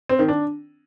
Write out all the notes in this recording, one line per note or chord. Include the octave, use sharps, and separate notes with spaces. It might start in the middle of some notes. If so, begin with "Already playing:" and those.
C4
D#3
D4